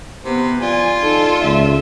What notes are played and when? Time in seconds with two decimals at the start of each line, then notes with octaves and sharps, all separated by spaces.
0.25 C3 B3
0.62 F4 D5 G#5
1.00 D#4 A4
1.44 C#2 E5